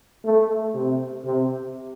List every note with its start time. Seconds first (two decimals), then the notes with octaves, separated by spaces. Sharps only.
0.24 A3
0.74 C3
1.25 C3